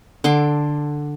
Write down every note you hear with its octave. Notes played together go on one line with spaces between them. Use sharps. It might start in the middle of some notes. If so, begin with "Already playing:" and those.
D3 A4 C6 D6